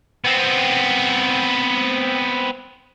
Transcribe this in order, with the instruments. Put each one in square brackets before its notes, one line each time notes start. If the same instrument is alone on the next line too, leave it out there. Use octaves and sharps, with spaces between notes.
[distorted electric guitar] B3 C4